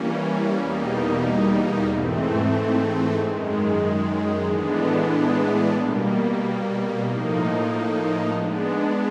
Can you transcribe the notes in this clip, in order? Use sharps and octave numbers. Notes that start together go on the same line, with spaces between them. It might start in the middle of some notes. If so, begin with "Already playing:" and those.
Already playing: E3 G3 A#3 C#4
E2 B2 G3 A#3 D#4
G#2 E3 A3 C4
F#2 D#3 G#3
A2 E3 G#3 B3 D4
B2 G3 A#3
A2 F3 A#3 D#4
G#3 B3 D4